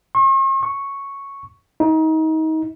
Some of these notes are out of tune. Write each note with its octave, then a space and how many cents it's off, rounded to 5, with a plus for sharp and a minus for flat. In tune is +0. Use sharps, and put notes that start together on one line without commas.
C#6 -45
C#6 +0
D#4 +30